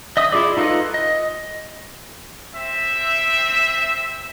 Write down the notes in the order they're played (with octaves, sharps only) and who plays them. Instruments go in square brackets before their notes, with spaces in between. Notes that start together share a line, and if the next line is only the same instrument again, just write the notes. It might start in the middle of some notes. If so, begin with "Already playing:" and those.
[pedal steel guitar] D#5 E5 D#6
E4 F4 G#4 D5
D#4 F4 A4 B4 D#5
D#5
[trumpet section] C4 E5